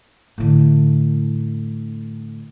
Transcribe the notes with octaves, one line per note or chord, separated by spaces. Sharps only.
A2 D3